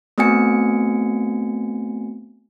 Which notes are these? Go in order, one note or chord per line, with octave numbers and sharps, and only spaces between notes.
A3 B3 C4 F#4 G#5 C#7